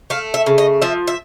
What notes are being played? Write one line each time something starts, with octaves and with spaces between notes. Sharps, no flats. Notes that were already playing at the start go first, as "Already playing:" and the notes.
A3 F5
E5
C#3
D#5
F3 E5
E5